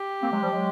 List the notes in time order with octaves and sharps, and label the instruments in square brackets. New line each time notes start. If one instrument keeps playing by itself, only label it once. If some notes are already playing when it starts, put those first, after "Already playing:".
Already playing: [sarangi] G4
[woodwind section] A#3 C4
F#3 G#3
F3 G3
F#3 G#3